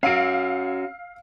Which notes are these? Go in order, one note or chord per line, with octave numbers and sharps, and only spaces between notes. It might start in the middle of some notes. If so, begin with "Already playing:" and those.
C#4 F#4 F5 E6 D7